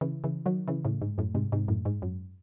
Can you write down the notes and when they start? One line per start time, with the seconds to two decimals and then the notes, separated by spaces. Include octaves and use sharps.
0.01 C#3 E3
0.24 C#3 E3
0.46 D#3 F#3
0.68 C#3 E3
0.85 A2 C#3
1.01 G#2
1.18 F#2 A2
1.34 G#2 C3
1.52 G#2 C3
1.68 F#2 A2
1.85 G#2
2.02 F#2